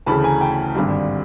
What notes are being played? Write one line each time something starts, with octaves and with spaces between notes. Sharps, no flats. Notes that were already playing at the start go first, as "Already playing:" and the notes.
D2 C#3 E3 A3 A5 B5
G#5 A#5
G5 A5
G#1 G2 D3 G3